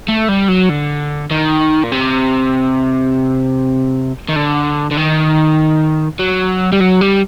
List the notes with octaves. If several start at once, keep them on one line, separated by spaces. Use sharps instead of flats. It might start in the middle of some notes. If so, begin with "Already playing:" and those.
A3
G3
F#3
D3
D#3
A#2
C3
D#3
D3
D3
D#3
F#3
G3
F#3
G3